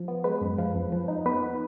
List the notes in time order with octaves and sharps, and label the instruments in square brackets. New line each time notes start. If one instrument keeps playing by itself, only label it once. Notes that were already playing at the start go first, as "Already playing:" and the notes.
Already playing: [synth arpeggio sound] F3
B3
G#3 B4
F#2
F3
F2
F3
D#4
B3 B4